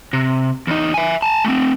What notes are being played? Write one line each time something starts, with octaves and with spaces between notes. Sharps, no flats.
C3
E2 D#4
E5 G#5
G#5 A5
A3 C4